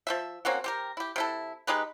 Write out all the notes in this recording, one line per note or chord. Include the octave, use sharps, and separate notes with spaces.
F3 C4 E5
A#3 C4 C#4 F#4
C4 G4 A#4
E4 G4
C3 E4 A4
G#3 D#4 G4 B4